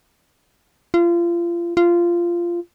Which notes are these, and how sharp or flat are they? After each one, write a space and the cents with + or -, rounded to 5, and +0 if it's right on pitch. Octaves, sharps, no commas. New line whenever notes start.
F4 -30
F4 -15